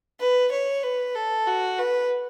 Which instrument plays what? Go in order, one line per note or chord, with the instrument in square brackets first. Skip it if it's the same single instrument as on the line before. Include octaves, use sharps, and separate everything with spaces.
[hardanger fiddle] B4
C#5
B4
A4
F#4
B4